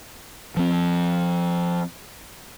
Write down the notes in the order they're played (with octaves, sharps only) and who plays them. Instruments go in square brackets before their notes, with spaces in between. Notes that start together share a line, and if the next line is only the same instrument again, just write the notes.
[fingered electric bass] F3 C4